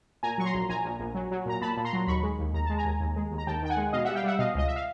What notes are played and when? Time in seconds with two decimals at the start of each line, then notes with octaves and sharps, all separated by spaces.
0.23 A#2 G#5 A#5
0.38 F#3 C#6
0.45 A#5 C6
0.54 A#1
0.69 A#1 G#5 A#5
0.85 A#1
1.00 A#1
1.15 F#3
1.31 F#3
1.46 A#2 A#5
1.62 A#2 A5 B5
1.77 A#2
1.85 A#5 C6
1.93 F#3
2.07 D#2 B5 C#6
2.23 G#3
2.39 D#2
2.54 D#2 A#5
2.66 G#3 A5
2.78 G#5 A#5
2.85 D#2
3.01 D#2
3.16 G#3
3.31 D#2
3.38 A#5
3.47 D#2 G5 A5
3.62 D#3 G5
3.70 F#5 G#5
3.77 G#3
3.93 B2 D#5 F5
4.05 G3 E5 F#5
4.15 F5 G5
4.24 G3 E5 F#5
4.39 B2 D#5 F5
4.55 C#2 D#5
4.68 E5
4.76 F5